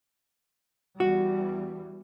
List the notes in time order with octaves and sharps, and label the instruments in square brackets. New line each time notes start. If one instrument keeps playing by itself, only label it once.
[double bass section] E2 E3 G3 [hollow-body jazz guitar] F#4